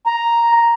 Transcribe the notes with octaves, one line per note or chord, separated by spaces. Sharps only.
A#5